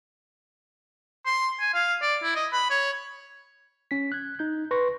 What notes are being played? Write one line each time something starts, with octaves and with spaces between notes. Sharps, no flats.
C6
G#5
F5
D5
E4
D#5
B5
C#5
C#4 B6
F#6 G#6
D#4 G6
B4 C6 C#6 A#6